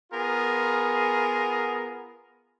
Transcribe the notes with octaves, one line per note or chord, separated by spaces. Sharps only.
B3 F4 G#4 A#4